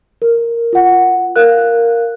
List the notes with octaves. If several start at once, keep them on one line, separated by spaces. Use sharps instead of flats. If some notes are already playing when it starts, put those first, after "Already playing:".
A#4
F4 F#5
A#4 F5 F#6